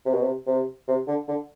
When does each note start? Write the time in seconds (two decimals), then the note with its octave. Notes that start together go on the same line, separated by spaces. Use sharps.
0.06 C3
0.14 B2
0.23 C3
0.47 C3
0.88 C3
1.08 D3
1.28 D3